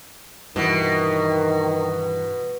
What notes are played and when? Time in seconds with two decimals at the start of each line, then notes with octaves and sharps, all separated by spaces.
0.56 G2 B2 D#3 E3